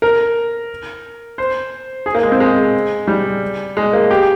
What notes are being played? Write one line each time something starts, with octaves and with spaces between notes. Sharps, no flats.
A#4
C5
G#4
A#3
G#3
C4
G#3
G3
G#3
A#3
G4